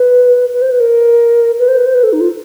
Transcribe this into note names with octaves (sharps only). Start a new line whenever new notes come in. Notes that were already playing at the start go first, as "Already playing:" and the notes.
Already playing: B4
B4
C5
B4
A#4
B4
C5
B4
C5
B4
A4
D#4
F4